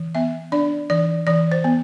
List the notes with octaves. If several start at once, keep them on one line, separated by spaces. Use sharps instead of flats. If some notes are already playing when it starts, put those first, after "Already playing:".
Already playing: E3
B3 E5
D4 D5
E3 D5
E3 D5
C5
B3